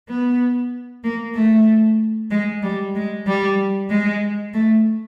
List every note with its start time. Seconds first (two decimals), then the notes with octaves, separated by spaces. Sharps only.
0.08 B3
1.04 A#3
1.35 A3
2.31 G#3
2.62 G3
2.95 G#3
3.27 G3
3.90 G#3
4.54 A3